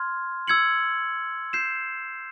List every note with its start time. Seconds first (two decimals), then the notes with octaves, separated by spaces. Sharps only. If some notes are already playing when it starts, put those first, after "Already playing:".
Already playing: C6 F6 G#6
0.48 E6 G#6 C#7 F#7
1.53 G6 C7 E7